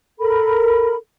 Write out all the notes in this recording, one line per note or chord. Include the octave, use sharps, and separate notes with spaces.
A4 A#4 B5